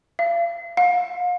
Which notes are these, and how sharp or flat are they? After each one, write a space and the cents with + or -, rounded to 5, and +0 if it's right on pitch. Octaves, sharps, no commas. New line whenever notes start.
F5 -40
F5 +40